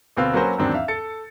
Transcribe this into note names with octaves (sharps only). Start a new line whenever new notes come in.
D2 B2 C4 B4 F5 E6
F#3 A#3 C#4 F#4 B4 C5
E2 G#2 D#3 F#3 C4 D4
E5 F5
A4 A6 C#7